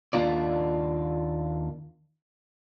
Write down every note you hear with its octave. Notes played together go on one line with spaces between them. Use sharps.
D#2 A#3 D4 F4 D5